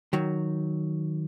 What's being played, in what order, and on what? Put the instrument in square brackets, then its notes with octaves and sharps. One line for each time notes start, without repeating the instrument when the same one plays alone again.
[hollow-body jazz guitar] D#3 F#3